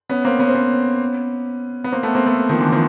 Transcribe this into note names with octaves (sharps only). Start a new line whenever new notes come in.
B3 C#4
A#3 C4
B3 C#4
C4
B3 C#4
B3
A#3 C4
A3 B3
A#3 C4
A3 B3
D#3 F3
D3 E3
D#3 F3